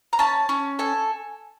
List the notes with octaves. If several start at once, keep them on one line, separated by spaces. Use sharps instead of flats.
A#5
C#4 A5
C#4
A4 G#5